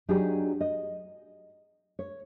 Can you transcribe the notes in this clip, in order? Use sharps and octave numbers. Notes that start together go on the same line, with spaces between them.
F#3 D4 D#4 G4 G#4
D#5
C#5